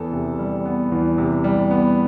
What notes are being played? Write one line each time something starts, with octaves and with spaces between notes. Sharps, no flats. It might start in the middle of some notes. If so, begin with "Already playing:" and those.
Already playing: E2 B3 A4
C3
G3
B3
E2
C3
G3
B3